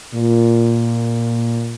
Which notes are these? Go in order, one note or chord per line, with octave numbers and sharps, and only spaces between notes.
A#2